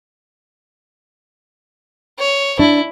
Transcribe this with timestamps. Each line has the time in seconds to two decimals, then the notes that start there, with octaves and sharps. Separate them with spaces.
2.19 C#5
2.59 D4 E4